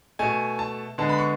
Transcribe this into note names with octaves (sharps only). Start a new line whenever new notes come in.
B2 A3 G#5
A5
D3 G#3 B3 A5
B5
C#6